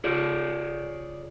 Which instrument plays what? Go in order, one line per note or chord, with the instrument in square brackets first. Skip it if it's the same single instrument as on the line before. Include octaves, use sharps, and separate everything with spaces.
[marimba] C#3 F4 [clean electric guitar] G#4 C#5 D5